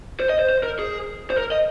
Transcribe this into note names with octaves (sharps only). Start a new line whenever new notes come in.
C5
D#5
C5
C5
A#4
G#4
C5
A#4
D#5